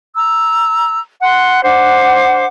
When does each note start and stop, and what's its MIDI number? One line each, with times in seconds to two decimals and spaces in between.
0.15 0.99 82
0.15 0.99 88
1.22 1.63 78
1.22 1.63 84
1.22 1.63 90
1.63 2.44 62
1.63 2.44 72
1.63 2.44 78
1.63 2.44 86